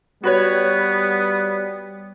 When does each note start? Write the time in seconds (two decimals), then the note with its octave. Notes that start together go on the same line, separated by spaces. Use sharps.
0.24 G3 B3 F#4 B4 C#5